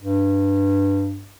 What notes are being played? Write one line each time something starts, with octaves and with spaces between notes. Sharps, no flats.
G2